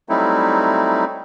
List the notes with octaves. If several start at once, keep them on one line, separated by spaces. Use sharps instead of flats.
F#3 G3 A3 C4 D#4 E4